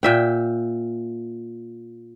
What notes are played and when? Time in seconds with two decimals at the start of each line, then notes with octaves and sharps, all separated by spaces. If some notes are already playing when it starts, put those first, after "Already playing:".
0.03 A#2 E5 G5